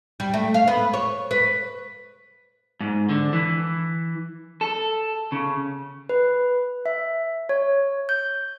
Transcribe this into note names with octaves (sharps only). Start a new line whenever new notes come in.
G3
A3
F5
B3
C#5
B4
G#2
D3
E3
A4
C#3
B4
E5
C#5
G6